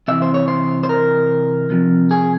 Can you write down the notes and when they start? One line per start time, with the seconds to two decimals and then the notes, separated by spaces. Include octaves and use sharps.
0.08 C3 E3 E5
0.22 C5
0.34 C#5
0.48 C5
0.83 C5
0.89 A#4
1.70 C3 F3
2.11 G#4